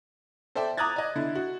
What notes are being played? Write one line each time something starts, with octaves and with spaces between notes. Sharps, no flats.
A4 C5 D5 E5 G5
A#5 D6 D#6 F#6 G#6 A6
D5 D#5
D3 E4
F#4